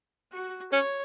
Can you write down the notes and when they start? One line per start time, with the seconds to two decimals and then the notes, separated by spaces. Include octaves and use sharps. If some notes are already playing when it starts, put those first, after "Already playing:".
0.32 F#4
0.73 C#4 C#5